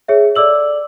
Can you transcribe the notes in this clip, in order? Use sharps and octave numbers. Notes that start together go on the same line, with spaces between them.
G#4 C#5 E5
A4 D5 D6 E6 F#7